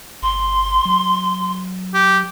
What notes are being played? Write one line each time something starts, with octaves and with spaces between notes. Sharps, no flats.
G1 C6
F#3
G4